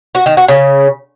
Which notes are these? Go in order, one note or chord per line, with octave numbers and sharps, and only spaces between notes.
F#4
D#3
F#4
C#3